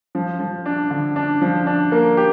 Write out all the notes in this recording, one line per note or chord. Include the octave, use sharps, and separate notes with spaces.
F3
F3
D4
D3
D4
F3
D4
A#3
G4